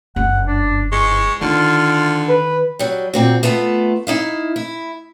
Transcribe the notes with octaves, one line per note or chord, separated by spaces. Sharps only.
F#1 G2 F#5
D4
G#3 C#6
D3 D#3 F4
B4
F#3 G3
A#2 C4 F#4
A3 B3 F4 A4
D#4 E4 F5
E4